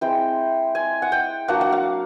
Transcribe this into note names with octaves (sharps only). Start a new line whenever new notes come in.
G#3 C4 E4 G5
G#5
F#5
G5
F#3 A#3 D4 F#5
F#5
F5